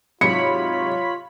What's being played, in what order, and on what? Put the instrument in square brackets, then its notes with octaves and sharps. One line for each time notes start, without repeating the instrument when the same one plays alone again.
[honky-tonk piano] G#2 C3 F#3 [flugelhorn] F4 [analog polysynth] C#5 B5 B6 [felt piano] C#7